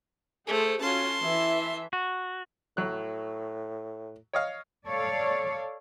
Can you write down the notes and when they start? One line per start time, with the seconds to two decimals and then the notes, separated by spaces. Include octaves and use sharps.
0.47 A3 G#4 A4 C5
0.81 C#4 F4 F#4 A5 C6
1.22 E3 E5
1.93 F#4
2.77 A2 F#3 F#6
4.33 C#5 D#5 F5
4.86 A4 C#5 D5 F5